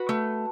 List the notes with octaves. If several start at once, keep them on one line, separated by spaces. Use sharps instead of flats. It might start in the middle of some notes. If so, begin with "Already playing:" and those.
Already playing: F#4 B4
A3